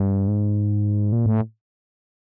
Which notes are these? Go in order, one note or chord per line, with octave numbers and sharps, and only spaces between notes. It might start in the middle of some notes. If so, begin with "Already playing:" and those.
Already playing: G2
G#2
A#2
A2